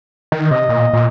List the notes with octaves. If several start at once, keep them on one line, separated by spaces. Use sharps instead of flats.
D#3
C3 D#5
A#2
A#2